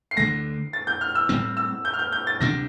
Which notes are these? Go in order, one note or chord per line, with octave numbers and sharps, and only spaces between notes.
C7
D2 D3 A3 A#6
A6
G6
F6
E6
A2 G3 C4
E6
G6
F6
G6
G6
A6
D2 C3 G3 D4 A#6